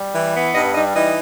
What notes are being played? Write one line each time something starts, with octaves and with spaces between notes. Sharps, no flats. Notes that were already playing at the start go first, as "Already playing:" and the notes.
Already playing: G3
E3
B3
G2 D#4 D#5
G3 D#4 D#5
E3 D#4 D#5